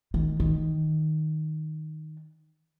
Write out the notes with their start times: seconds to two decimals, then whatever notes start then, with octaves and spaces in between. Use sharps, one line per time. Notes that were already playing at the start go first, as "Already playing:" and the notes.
0.14 D#3
0.40 D#3